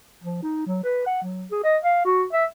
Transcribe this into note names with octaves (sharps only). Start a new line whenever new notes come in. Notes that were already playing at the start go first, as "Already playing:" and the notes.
F3
D#4
F#3
B4
F#5
F#3
G#4
D#5
F5
F#4
E5